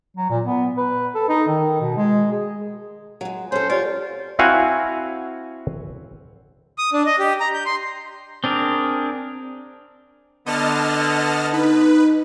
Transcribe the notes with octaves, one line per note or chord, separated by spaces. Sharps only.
F#3
A#2
B3
B4
A4
D#4
D#3
B2
G#3
G#4
F#3 G#3
C#4 A4 C5
F4 G4 C#5 D5
C4 E4 F#4 F5 F#5 G#5
D#6
D4
D#5
G4
A#5
G6
C6
C4 D4 G#4 A#4
D3 B3 D#5 A5 F6
D#4 B4